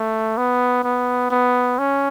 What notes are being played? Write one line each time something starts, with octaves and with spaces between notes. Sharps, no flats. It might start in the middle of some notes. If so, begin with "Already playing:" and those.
Already playing: A3
B3
B3
B3
C#4